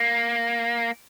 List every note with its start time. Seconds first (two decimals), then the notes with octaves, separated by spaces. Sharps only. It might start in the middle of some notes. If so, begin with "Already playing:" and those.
Already playing: A#3